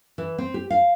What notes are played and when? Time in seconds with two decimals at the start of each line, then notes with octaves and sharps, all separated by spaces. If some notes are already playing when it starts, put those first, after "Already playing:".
0.18 E3
0.38 C4
0.54 G4
0.70 F5